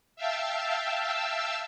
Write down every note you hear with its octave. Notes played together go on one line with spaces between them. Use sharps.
E5 F5 G5 A5 E6